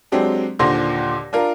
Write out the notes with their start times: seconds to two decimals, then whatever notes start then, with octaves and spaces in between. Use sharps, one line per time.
0.12 F#3 G#3 C4 D4 G4
0.59 D#2 A#2 D3 C5 C6 A#6
1.33 D4 F4 A#4